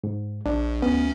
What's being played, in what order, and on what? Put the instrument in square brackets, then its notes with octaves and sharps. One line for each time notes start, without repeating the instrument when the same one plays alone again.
[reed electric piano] G#2
[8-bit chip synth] A#1 [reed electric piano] D4
[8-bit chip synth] D2 C#4 [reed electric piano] B3